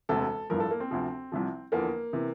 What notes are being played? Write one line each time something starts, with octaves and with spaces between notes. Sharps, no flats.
E1 D2 C3 A4
A1 G2 F3 A#4
A4
A#3
C4
D2 C3 F3
C2 C3 F3
E2 D3 F3 A#3
C3 E3